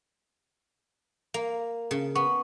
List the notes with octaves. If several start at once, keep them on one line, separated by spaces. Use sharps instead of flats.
A#3
C#3
B3 C#6